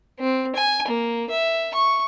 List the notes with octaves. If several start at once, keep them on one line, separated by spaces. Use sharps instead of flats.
C4
G#5
A#3
E5
C#6